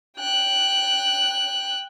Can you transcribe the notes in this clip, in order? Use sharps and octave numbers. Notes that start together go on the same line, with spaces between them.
G5 F#6